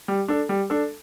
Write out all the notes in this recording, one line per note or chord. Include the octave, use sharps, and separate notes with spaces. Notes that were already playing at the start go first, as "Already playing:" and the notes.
G3
D4 A4
G3
D4 A4